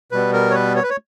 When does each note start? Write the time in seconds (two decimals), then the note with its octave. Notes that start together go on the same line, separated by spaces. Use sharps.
0.12 B2 G3 B3 B4
0.33 A#4
0.51 C#5
0.54 B4
0.76 C#5
0.83 B4
0.90 C#5